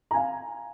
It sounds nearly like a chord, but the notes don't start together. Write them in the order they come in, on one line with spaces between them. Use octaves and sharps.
A#5 G#5 F5